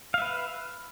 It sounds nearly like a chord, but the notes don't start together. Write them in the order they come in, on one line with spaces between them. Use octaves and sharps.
F5 E5 B4